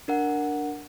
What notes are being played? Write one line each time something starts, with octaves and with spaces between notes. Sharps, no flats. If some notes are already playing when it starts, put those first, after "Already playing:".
D4 A#4 F#5